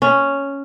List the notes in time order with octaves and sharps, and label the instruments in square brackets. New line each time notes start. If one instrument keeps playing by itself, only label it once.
[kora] C#4